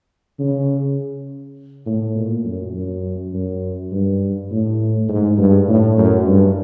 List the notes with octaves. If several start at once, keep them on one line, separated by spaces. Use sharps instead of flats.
C#3
A2
A#2
F#2
F#2
F#2
G2
A2
G#2
G2
A2
F#2
G2